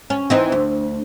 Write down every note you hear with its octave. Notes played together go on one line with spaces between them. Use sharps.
C#4
E3 C4 D#4
D2